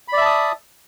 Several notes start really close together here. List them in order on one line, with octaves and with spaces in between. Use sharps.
B5 D5 E5 A5 D#6